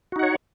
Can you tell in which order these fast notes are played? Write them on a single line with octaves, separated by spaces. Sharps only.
F#4 D#4 F#5 C#5